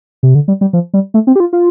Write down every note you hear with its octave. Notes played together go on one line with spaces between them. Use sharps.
C3
D3
G3
G3
F3
G3
A3
C4
G4
F4
F4